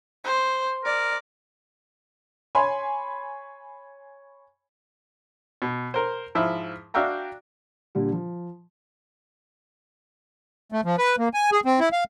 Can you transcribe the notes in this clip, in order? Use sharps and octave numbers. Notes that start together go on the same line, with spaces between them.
C5
A#4 D5
C#5 G#5 B5 C6
B2
A#4 C5
G#2 F3 E4
D4 F#4 E5 F5 G5 A#5
A#2 D3 G3
F3
A3
F3
B4
A#3
G#5
G#4
C4
E4
F5